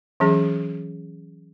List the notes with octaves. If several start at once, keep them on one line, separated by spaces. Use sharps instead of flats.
E3 F#3 C#4 G#4